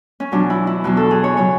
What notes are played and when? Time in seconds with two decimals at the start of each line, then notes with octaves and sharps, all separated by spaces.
0.20 C#4
0.32 E2 B2 F#3 D4
0.50 E4
0.67 E4
0.84 E2 B2 F#3 F#4
0.97 A4
1.11 G#4
1.24 C#5
1.37 C#3 F#3 C#5